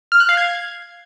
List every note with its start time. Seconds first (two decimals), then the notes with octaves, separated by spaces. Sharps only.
0.12 F6
0.20 F#6
0.29 F5
0.37 G#6